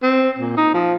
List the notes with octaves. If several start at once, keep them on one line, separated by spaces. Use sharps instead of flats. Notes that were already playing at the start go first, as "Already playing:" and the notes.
C4
A#2
D#4
F3